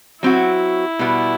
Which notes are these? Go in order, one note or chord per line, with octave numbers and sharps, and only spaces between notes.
F#3 C4 E4 F#4
B2 G3 B3